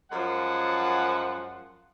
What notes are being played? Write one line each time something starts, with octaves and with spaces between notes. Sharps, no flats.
F#2 F3 G#3 F#5